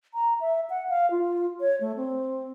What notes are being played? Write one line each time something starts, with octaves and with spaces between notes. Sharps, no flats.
A#5
E5
F#5
F5
F4
C#5
A3
C4